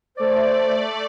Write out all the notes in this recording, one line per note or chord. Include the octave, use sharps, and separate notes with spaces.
A3 C5 D5